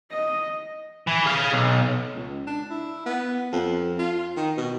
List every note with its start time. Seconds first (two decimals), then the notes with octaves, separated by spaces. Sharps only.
0.11 D#5
1.07 E3
1.26 G#4 F5
1.53 B1
2.15 C#2
2.47 D4
2.70 E4
3.06 B3
3.52 F2
3.99 F4
4.37 D#3
4.58 B2